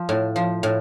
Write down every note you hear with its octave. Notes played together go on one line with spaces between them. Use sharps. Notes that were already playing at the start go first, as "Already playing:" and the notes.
Already playing: F3
A2
F3
A2